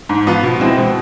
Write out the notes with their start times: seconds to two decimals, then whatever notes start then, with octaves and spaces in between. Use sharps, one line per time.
0.09 G#2
0.26 F3 B3 F4
0.43 B2
0.60 G#3 C4 E4
0.78 B2